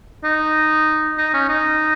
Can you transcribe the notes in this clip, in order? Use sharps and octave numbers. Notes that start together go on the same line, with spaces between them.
D#4
D#4
C#4
D#4